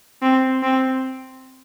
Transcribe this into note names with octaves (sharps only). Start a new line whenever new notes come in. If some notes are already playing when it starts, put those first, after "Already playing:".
C4
C4